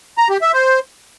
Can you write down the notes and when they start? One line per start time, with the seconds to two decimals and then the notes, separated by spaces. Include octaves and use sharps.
0.18 A#5
0.30 G4
0.42 E5
0.53 C5